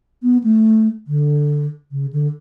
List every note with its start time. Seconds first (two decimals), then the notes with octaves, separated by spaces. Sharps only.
0.23 B3
0.44 A3
1.07 D3
1.92 C#3
2.13 D3